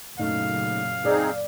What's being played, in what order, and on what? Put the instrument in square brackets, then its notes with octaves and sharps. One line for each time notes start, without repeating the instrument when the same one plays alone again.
[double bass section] F#2 A#2 C#3 [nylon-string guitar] A3 D#4 [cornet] F5
[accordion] C4 D#4 G#4 [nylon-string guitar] D5